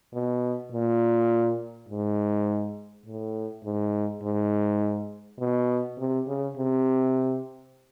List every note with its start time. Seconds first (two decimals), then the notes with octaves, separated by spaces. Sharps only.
0.14 B2
0.72 A#2
1.89 G#2
3.06 A2
3.64 G#2
4.23 G#2
5.40 B2
5.98 C3
6.27 C#3
6.57 C3